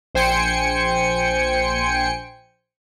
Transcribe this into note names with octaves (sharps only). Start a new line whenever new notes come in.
A#1 C5 G5 G#5 C#7